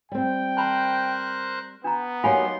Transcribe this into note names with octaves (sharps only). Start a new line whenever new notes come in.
G3 C4 G5
A#4 C5 A5 B5 F#6
B3 D4 A#5
F#3 A#3 D#4 G4 F5 G#5 B5 C6